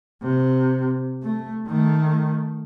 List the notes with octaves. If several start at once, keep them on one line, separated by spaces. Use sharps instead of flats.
C3
A3
D#3 A3